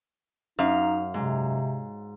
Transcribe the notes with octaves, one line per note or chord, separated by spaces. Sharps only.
F#2 D#4 F5
G#2 C3